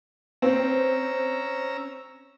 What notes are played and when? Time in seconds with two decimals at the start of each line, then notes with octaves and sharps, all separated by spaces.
0.42 C4 C#4 A#5 E6